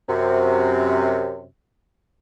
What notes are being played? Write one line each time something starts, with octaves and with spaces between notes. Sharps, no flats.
F#2 C3